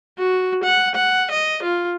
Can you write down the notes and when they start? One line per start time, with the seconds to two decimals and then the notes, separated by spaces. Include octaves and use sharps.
0.18 F#4
0.64 F#5
0.95 F#5
1.31 D#5
1.63 F4